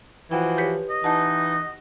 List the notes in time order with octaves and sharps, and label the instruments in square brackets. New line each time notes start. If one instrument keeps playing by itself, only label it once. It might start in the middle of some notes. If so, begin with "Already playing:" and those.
[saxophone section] E3 F3 F#4 [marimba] G5
[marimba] G4 B4 C#5
[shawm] D#5
[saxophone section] E3 D#4 F#5 [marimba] A5